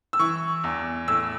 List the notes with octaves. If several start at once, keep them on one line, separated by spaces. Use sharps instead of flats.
E6
E3 C#6
E2
A2 E6